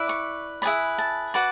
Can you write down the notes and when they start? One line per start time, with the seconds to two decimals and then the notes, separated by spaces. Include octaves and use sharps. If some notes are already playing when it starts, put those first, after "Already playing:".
Already playing: E4 B4 D5
0.09 C#6
0.62 E4 G#4 B4 D5 B5
0.98 A5
1.34 F#4 B4 D5